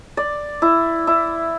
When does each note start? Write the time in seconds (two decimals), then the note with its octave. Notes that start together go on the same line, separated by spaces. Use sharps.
0.17 D5
0.62 E4
1.07 E4